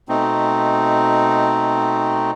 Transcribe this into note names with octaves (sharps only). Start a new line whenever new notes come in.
B2 A3 C4 D#4